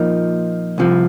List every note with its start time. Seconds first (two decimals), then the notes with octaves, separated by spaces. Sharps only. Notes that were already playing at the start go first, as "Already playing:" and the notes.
Already playing: A#2 F3 A#3 D#4
0.78 C2 C3 F3